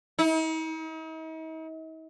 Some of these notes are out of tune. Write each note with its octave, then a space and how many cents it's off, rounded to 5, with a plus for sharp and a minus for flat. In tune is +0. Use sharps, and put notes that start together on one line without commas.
D#4 +45